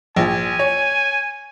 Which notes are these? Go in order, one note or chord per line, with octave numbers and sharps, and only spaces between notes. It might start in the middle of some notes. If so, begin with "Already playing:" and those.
A#1 G#5
C#5